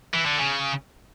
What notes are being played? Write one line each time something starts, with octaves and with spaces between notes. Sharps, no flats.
E3
D3
C#3